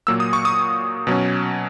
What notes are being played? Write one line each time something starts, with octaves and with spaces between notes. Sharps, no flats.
A#2 F#3 A#3 E6
D#6
C#6
D#6
B2 F#3 C#4